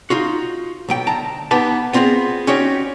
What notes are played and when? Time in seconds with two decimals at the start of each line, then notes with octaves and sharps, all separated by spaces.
0.10 D#4 F4 F#4
0.89 B1 F#3 G5
1.07 D2 A5 A#5
1.51 B3 D#4 G4 B4 A5
1.93 B3 C4 F4 G4 G#4
2.47 C#4 D#4 F#4 G4 C#5